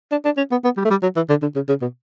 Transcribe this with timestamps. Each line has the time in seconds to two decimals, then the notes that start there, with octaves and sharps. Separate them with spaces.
0.11 D4
0.25 D4
0.37 C#4
0.51 B3
0.64 B3
0.77 G3
0.85 A3
0.90 G3
1.03 F#3
1.16 E3
1.29 D3
1.42 D3
1.55 C#3
1.68 C#3
1.82 B2